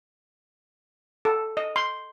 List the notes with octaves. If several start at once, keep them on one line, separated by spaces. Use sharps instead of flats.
A4
D#5
C6